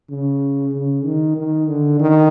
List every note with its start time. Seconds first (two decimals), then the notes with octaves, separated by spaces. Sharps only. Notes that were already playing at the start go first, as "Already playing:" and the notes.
0.10 C#3
0.73 C#3
1.05 D#3
1.37 D#3
1.68 D3
2.00 D#3